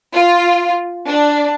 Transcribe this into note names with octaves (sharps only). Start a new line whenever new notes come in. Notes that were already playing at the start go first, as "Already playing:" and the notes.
F4
D4